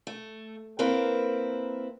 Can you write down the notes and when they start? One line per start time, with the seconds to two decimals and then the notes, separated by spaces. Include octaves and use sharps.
0.07 A3
0.79 A#3 C4 E4 A#4 B4